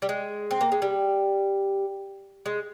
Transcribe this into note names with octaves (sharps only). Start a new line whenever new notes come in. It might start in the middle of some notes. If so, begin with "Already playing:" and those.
G3
G#3
C4
A#3
G#3
G3
G#3